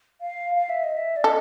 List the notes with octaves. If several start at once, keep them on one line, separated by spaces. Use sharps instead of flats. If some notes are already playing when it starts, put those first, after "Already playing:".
F5
F5
E5
D#5
E5
D5
A4 D#5